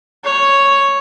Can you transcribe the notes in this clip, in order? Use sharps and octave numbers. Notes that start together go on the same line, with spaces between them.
C#5